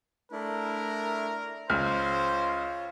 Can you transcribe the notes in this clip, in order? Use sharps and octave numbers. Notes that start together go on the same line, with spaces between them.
A3 D4 E4 A#4
C#2 F4 C5 C#5 F6